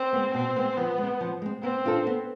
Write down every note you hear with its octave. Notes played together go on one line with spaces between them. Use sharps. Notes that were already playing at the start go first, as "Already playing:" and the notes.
Already playing: C4
G#3 B3
B2 C4
G#3 B3
F3 B3
G#3 C4
F3
G#3 C4
B3 C4
D4 F4 A4
B3